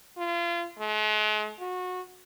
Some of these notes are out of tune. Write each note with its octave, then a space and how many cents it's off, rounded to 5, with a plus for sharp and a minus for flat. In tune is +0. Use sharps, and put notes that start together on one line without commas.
F4 -30
G#3 +45
F#4 -25